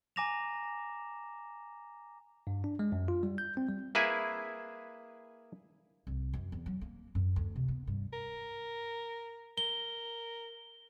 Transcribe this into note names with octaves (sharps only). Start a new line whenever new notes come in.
G#5 A#5 D6 A#6 E7 F7
G2
D4
G#3
F#2
F4
G3
G6
C4
G3
A#3 E4 G#4 B4 E5 G#5
C2
F#2
E2
F#3
A#3
F#2
D2
C3
B3
G2
A#4
A#4 G7